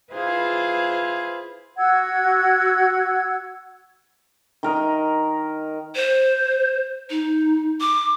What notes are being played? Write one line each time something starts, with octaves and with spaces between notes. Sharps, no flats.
E4 F4 G#4 B4 C5 F5
F#4 F#5 E6 G#6
D#3 A#4 D#5
C5
D#4
D6